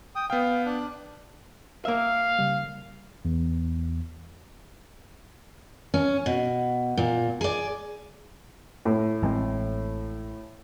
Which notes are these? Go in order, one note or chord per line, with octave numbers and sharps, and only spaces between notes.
G5 D#6
B3 F5 G5
D4 F#6
A#3 E5 F5
C#3 G3
E2
C#4
B2
A#2
G#4 D5
A2
A1 G#3 C4